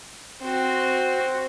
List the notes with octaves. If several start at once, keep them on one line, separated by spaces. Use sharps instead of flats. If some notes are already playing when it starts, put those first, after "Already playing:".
C4 F#4